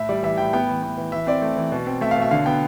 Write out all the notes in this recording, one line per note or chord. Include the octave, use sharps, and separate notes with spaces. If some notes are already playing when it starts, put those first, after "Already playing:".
Already playing: A2 E5
G3 D5
E3 E5
A2 G5
B3 G5
E3
B3
E3
E3 E5
C4 D5
A3
E3
B2
C4
A3 E5
F5
B2
E5
D3 F5
B3 G5